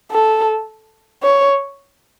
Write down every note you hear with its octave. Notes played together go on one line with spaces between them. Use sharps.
A4
C#5